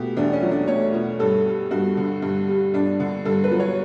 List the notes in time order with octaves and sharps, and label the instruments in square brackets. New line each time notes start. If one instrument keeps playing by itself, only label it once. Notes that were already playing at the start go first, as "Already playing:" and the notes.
Already playing: [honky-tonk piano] B2 A3 G4
E2 D4
C#4
F#3
D4
A3 C#5
B2
G2 A4
G3
G2 F#4
D3
G2
G3
G2 D4
D3
G2 A4
B4
F#3
C#5